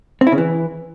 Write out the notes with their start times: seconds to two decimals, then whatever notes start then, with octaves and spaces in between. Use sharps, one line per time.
0.21 C4
0.27 E4
0.32 C#3
0.38 E3